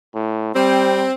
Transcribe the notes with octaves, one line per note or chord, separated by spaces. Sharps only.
A2
G3 C4